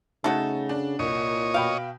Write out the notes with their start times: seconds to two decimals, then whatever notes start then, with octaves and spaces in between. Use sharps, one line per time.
0.24 C#3 F#3 A3 D#4 F#4 A4
0.69 D4
0.99 C2 A#2 C#5 D#5
1.54 B2 F5 G5 B5